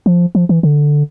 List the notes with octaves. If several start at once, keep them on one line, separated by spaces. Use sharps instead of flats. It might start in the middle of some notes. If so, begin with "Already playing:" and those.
F3
F3
E3
D3